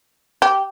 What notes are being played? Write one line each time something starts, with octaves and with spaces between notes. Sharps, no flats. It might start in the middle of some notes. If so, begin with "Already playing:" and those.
G4